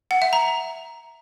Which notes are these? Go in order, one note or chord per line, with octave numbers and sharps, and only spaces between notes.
F#5
E5
A#5